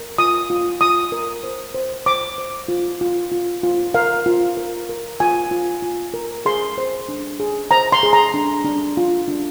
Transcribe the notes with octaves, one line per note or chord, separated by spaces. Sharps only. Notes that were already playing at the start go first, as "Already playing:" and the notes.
Already playing: A#4
F4 D#6
F4
F4 D#6
A#4
C5
C5
C5 D6
C5
F4
F4
F4
F4
A#4 F5
F4
A#4
A#4
F4 G#5
F4
F4
A#4
G#4 C6
C5
D4
G#4
C5 A#5
C6
G#4
A#5
D4
D4
F4
D4